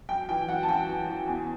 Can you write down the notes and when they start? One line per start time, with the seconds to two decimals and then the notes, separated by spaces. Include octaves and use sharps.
0.09 F#2 G5
0.29 E3 G5
0.48 F#2 F#5
0.63 A5
0.68 F#2 G5
0.88 E3
1.09 E3
1.28 E2